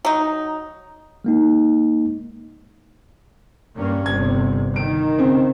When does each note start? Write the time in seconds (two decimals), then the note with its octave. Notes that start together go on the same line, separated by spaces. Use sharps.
0.05 F#3 D#4
1.25 G#3 A#3 D#4
3.76 G2 A#3 C#4
4.06 G1 C3 G#6
4.76 D#3 D7
5.19 C#3 C4